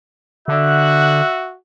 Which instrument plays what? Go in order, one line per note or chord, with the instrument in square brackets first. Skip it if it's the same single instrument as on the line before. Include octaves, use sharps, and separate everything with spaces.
[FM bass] D3 [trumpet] F#4 [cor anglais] E5 [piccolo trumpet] F#6